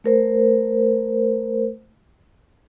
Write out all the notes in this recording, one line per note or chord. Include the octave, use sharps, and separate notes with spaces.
A3 A#4 C5